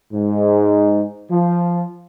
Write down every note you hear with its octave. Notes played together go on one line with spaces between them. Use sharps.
G#2
F3